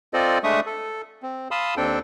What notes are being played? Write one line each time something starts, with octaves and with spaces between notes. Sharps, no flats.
C4 F4 A4 C5 D5 D#5
G#3 A3 D4 E5 C#6 D#6
A4
C4
F5 A5 B5 C6 D#6 E6
D#2 C4 D4 A4 G5